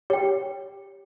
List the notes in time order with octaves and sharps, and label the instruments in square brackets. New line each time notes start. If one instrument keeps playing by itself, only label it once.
[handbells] G4 [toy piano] C#5 G5